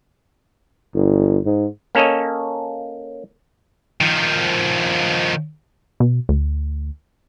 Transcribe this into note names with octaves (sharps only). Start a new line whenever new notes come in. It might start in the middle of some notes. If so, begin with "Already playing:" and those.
G1
G#2
A#3 C#4 A4 C#5 D#5
D#3 F3
B2
D2